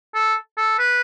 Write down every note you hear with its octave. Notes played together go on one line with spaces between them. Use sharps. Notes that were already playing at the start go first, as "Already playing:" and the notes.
A4
A4
B4